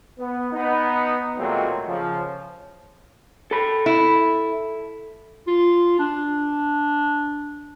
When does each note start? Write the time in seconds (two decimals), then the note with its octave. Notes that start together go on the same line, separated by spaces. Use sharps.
0.19 B3
0.53 B3 D#4
1.38 A#2 D#3 F#3 G#3 A3 C4
1.87 C#3 F3
3.51 A4 B5
3.86 E4
5.47 F4
5.99 D4